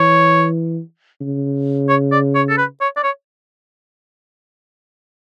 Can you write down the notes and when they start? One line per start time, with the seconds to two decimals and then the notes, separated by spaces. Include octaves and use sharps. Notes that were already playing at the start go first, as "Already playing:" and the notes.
Already playing: E3 C#5
1.21 C#3
1.89 C#5
2.12 D5
2.35 C#5
2.49 A4
2.57 B4
2.81 C#5
2.96 D5
3.03 C#5